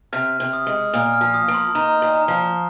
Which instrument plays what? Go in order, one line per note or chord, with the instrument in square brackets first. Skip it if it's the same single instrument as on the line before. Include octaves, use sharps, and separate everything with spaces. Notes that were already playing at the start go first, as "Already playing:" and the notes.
[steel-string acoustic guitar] C3 [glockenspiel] F6
[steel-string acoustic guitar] C3
[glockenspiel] D#6
[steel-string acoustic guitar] G#3
[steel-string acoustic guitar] A#2 [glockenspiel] F6
[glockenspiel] F6
[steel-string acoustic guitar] F3
[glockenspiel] D#6
[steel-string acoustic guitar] A#3
[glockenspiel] C6
[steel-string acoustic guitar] D#4 [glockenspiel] A#5
[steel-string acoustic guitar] A#2
[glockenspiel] A#5
[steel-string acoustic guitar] F3